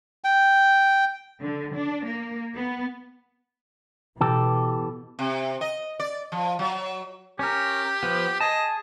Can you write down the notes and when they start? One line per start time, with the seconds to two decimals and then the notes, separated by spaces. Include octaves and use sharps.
0.24 G5
1.41 D3
1.75 D4
2.05 A#3
2.54 B3
4.21 B2 E3 G4 A4
5.19 C3
5.61 D#5
5.99 D5
6.32 F3
6.59 F#3
7.39 C#4 G4 A#4
8.03 F3 B3
8.41 G#4 D#5 A5